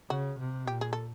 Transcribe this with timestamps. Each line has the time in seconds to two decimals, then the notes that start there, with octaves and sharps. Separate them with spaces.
0.10 C#3 F#4
0.38 C3
0.67 A#2 G4
0.81 G#4
0.93 A4